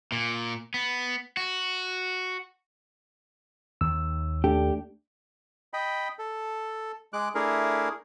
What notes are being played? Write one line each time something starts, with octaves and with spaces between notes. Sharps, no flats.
A#2
B3
F#4
D#2 D#3 E6
A3 D4 G4 A4
D#5 G5 B5
A4
G#3 D6 F#6
A3 D4 E4 G#4 A#4